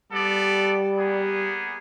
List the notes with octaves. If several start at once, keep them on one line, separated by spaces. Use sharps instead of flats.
G3 B3 A4 D5
A#3 B3 G#4